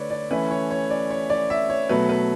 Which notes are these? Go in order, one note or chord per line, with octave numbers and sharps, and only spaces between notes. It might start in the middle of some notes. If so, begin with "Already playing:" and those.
Already playing: D3 A3 B4 C#5 D5
D5
E3 A3 C#4 B4
C#5
C#5
D5
C#5
D5
E5
C#5
B2 F#3 A3 B4
B4